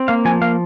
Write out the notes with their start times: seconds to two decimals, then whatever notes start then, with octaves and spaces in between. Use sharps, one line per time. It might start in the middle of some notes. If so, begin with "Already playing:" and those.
Already playing: C4
0.08 A#3 F5
0.25 F3 G#5
0.41 A#3 F5